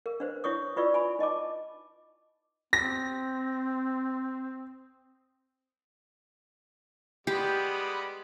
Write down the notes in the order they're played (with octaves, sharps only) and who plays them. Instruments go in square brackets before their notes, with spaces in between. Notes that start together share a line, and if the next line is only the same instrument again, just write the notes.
[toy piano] A#4
D4 B4 C5
D4 E4 C#5 C#6 D#6
E4 F4 B4 D5 C#6 E6
G#5 B5
D#4 D#5 A5 D6
[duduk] C4 [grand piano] A#6
[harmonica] G3 G#3 B3 [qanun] G4